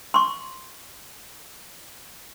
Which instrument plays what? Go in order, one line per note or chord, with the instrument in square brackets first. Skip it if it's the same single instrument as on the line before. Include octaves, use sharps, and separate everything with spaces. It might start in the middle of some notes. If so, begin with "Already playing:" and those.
[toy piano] C6 C#6